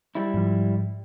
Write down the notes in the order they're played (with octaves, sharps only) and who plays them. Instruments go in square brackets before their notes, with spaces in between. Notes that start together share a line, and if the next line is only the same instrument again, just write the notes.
[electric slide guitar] G3 E4
[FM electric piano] G#2 F3